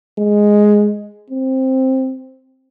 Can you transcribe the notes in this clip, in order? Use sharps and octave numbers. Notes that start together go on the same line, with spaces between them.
G#3
C4